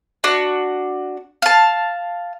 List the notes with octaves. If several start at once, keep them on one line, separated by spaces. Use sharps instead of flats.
D4 F#4
F5 A5